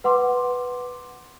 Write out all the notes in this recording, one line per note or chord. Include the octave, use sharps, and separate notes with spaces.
B4 F#5 C6 D6